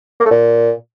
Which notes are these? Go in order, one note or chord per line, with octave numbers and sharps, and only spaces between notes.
A#3
A3
A#2